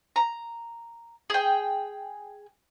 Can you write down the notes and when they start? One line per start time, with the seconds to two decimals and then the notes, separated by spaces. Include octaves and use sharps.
0.16 A#5
1.30 G#4 G5